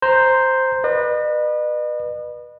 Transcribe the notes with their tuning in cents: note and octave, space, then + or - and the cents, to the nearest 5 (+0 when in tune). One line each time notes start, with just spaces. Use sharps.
C5 +0 A#5 +0
B4 -15 D#5 -45